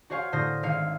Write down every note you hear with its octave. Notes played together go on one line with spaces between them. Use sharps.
F#4 C5 C#5 F5 G#5 C#6
A2 D3 C5 D#6 F6 A#6
G#1 C#5 F5 C#7